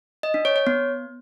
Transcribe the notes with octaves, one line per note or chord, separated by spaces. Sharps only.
D#5
D4
C#5
C#5
B3